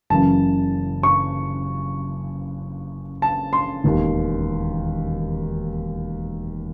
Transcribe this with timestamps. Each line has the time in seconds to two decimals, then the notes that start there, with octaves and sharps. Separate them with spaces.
0.10 F#1 F#2 C#3 E3 A5
1.03 C#6
3.22 A5
3.53 C6
3.84 E1 D#2 D#3